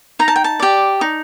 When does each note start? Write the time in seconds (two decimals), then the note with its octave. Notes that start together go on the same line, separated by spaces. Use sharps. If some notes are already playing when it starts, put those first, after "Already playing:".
0.19 D#4 A#5
0.28 A5
0.36 G5
0.44 A5
0.60 G4 D5
1.01 D#4